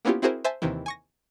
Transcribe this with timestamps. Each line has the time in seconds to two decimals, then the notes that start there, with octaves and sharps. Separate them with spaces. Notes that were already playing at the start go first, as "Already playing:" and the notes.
0.05 A#3 B3 C#4 E4 F4 G4
0.22 C4 E4 F#4 G#4 A#4 C5
0.44 C5 E5 G#5 A5
0.62 D#2 C3 D#3 E3
0.86 G#5 C#6 A#6